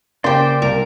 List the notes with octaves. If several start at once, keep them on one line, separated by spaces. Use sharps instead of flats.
C#3 A#3 G4 C5 D5 G5 C6
C2 A#4